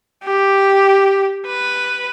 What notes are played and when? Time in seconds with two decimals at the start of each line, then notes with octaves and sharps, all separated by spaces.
0.24 G4
1.46 B4